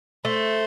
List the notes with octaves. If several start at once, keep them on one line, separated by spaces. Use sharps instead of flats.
A3 C5